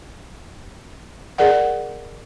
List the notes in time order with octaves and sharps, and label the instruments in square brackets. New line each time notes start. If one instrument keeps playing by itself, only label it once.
[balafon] G#4 A#4 D5 F#5